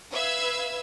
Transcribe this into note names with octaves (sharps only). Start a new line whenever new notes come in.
B4 E5 F5 E6 G#6